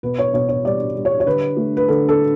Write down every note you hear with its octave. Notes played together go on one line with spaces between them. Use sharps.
B2 B4
C#5
B2 C#5
C#5
G3 D5
G3
C#5
C#5
D3 B4
A3
B4
D3 A4
A4